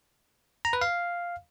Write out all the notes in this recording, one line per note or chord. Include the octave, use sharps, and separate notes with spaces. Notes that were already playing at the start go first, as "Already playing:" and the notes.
A#5
B4
F5